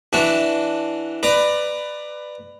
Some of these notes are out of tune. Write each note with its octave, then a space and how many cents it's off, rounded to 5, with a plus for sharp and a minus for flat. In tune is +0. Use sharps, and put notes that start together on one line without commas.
E3 +0 D4 +0 F#4 +0
B4 +10 D5 +20 A#5 +0